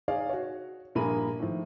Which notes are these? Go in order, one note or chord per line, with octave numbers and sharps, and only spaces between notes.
D#4 G#4 C#5 D5 F5
F#4 C#5
A#1 G2 A#3 G#4 B5 D#7
A2 D#3 F3